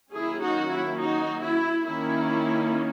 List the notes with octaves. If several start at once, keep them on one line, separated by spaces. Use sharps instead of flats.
D#3 F#3 A#3 C#4 E4 G#4
D#4 F#4
E4
D#4 F#4
E4
D#3 A#3 C#4 E4